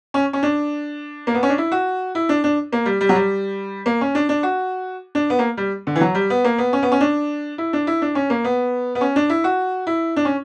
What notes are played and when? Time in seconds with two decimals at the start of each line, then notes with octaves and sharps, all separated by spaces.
0.14 C#4
0.33 C#4
0.43 D4
1.27 A#3
1.34 B3
1.43 C#4
1.49 D4
1.58 E4
1.72 F#4
2.15 E4
2.29 D4
2.44 D4
2.72 A#3
2.86 G3
3.01 G3
3.09 F#3
3.15 G3
3.86 A#3
4.01 C#4
4.15 D4
4.29 D4
4.43 F#4
5.15 D4
5.30 B3
5.39 A#3
5.57 G3
5.87 D3
5.96 E3
6.01 F#3
6.15 G3
6.30 B3
6.44 A#3
6.58 B3
6.73 C#4
6.83 B3
6.92 C#4
7.00 D4
7.58 E4
7.73 D4
7.87 E4
8.02 D4
8.15 C#4
8.30 A#3
8.44 B3
8.95 B3
9.01 C#4
9.16 D4
9.30 E4
9.44 F#4
9.87 E4
10.16 D4
10.25 C#4